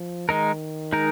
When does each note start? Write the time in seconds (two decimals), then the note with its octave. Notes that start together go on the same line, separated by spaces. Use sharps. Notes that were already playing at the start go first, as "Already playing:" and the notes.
Already playing: F3
0.29 D#3 G#3 D#4 A#4
0.92 G#3 D#4 A#4